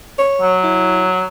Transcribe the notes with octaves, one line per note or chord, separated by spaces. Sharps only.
C#5
F#3
E4